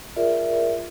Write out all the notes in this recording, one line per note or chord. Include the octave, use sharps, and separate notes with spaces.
F4 G#4 A#4 D5 E5